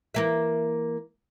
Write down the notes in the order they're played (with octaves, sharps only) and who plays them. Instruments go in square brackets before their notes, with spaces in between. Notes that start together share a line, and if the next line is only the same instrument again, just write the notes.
[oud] E3 A#3 E5